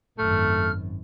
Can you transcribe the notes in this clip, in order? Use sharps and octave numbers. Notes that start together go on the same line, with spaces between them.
G#1 F#2 A3 F6